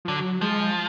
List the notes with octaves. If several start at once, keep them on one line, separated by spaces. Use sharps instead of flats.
F3
D3 F#3
F3 G#3